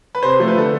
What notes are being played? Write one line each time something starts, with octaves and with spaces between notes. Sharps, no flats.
B4
C3 C5
F3 A3 C5
B4
D3 A4